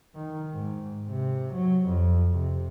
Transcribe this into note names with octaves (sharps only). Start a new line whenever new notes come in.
D#3
G#2
C3
F#3
F2
C3